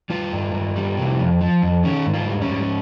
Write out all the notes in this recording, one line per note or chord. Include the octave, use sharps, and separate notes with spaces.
G3 F4
G2
G2
G3
C3
F2
F3
F2
D#3 C#4
G#2
F4
G3
C#4
G#2